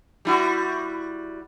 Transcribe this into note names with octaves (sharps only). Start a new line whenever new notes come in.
G3 E4 F#4